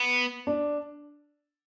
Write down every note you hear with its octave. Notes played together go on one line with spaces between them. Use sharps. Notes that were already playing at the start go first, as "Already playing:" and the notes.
Already playing: B3
D4